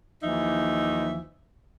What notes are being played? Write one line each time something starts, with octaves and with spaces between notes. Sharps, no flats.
D#2 E3 F3 D#4 E5